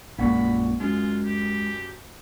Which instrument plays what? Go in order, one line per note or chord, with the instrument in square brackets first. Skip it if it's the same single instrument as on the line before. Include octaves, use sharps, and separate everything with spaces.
[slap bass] A#1 F#2 G#3 [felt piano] A#2 F#5 C#6 [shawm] B5
[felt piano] F#2 [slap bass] G#3 [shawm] F4
[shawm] G4